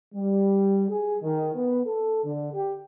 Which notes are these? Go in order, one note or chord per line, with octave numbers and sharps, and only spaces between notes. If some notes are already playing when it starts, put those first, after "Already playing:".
G3
G#4
D#3
B3
A4
D3
G4